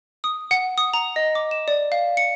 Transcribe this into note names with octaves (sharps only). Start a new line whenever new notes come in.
D#6
F#5
D#6
A#5
D#5
D6
E7
D5
F5
C#7